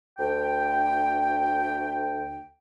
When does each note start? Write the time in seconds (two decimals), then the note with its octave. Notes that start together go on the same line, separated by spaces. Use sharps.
0.19 D2 G5